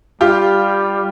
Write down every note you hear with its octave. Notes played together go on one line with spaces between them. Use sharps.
G3 F4 G4